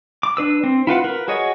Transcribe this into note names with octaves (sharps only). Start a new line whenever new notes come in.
D6
D4 B4 E6
C4
E4 F4 B4 F#5
A#4 B4
F#4 G#4 C#5 D#5